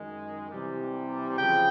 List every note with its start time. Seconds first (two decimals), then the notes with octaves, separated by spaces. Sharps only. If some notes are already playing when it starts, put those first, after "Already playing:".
Already playing: F#2 D#3 G#3
0.51 C3 E3 G3
1.38 C#3 F3 G5